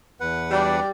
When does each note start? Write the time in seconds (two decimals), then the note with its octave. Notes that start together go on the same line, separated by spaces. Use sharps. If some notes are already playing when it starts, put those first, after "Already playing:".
0.20 E2 B4 F#5
0.51 F#3 G3 D4